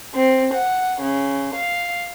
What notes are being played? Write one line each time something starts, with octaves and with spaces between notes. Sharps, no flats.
C4
F#5
C#3
F5